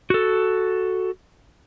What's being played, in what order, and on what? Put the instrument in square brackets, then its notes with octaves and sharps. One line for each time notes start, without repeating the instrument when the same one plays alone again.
[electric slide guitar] F#4 A4